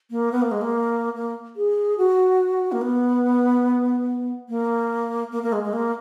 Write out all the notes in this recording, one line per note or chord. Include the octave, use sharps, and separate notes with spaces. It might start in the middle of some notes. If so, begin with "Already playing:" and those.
A#3
B3
A#3
G#3
A#3
A#3
G#4
F#4
A#3
B3
A#3
A#3
A#3
G#3
G#3
A#3